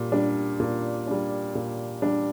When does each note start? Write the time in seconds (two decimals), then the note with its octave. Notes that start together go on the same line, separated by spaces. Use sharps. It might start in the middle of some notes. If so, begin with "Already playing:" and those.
Already playing: A#2 G3
0.12 G3 D4
0.60 A#2
1.07 G3 D4
1.55 A#2
2.02 G3 D4